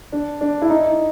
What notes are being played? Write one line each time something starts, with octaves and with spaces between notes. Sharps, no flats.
D4
D4
E4
D#4